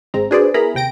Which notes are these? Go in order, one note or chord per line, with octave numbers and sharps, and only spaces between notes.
G#1 G#3 C4 A#5
D4 F#4 G#4 B4 C5 D5
B3 E4 G#4 A#4 A#5 B5
D#2 C3 G5 A#6 D7